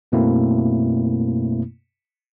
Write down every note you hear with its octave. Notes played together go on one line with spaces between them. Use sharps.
F#2 B2 A3 A#3 C4 E4